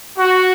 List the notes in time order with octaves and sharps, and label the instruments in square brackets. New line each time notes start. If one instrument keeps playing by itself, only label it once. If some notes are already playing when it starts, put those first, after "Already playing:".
[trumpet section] F#4